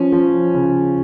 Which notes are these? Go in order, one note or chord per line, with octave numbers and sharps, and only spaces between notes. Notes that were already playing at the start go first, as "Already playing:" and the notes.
Already playing: F3 C#4
F3
C#3